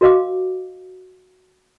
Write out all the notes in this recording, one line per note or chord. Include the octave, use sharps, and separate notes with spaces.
F#4 A#4 D#5 F5 D6